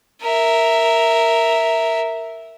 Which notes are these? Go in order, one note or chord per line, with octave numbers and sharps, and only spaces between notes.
A#4 E5